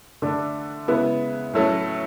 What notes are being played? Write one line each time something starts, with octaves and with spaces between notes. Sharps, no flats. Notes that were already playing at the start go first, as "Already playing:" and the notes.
D3 A3 D4
C#3 G#3 B3 E4 B4
A2 F#3 A3 C#4